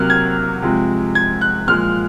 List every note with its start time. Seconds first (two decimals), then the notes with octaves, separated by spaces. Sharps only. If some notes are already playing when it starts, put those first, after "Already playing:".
Already playing: C3 F#3 A#3 F6 F#6
0.10 G#6
0.62 C3 F3 G#3
1.15 G#6
1.41 F#6
1.68 A#2 F3 G#3 F6